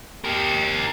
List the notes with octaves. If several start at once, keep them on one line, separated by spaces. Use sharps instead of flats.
G4 A#4